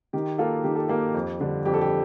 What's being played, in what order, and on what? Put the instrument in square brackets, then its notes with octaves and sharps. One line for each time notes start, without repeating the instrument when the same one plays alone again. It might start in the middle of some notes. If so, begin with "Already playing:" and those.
[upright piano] D#3 G4
A#3 D#4 F4 A4
D#3 G4
A4
A#3 D#4 G4
F2
D3 G3 D4
F2 G4
A4
G4